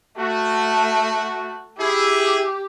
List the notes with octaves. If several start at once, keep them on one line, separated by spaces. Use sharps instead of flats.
A3 F#4
E4 G4 G#4